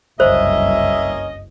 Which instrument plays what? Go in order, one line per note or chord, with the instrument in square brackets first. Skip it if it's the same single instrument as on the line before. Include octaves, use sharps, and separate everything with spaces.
[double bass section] F#1 C2 G2 [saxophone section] A#3 C#4 D#5 [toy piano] C5 [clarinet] E5